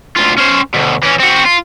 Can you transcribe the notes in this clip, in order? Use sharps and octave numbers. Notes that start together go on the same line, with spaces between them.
D2 F4
C#4 C5
D2 B2
E3 C#4
C4 F#4
F4